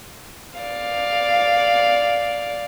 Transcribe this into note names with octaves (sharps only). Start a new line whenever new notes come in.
D5 F5